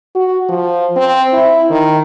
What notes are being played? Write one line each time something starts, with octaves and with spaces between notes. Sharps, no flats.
F#4
F3
C4
E4
D#3